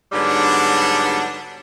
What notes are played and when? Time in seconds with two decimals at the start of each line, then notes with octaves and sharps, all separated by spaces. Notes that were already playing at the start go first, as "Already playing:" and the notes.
0.12 G#2 D3 F#3 G3 B3 D4